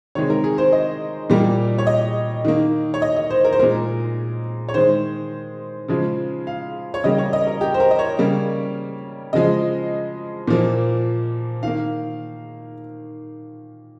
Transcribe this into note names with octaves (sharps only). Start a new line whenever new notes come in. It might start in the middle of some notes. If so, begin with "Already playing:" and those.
C3 D#3 G#3 C#5
A#4
G#4
C5
D#5
A#2 G3 A#3
C#5
D#5
D#3 A#3
C#5
D#5
D#5
C5
A#4
C5
A#2 G#3 A#4
C#5
D#3 G#3 C5
C#3 F3 G#3
F5
C#5
C#3 G3 A#3 D#5
C#5
D#5
A#4
G4
C5
A#4
D#5
C#5
C#3 G3 A#3
C#3 F3 G#3 D#5
A#2 F3 A#3
D#3 A#3 F5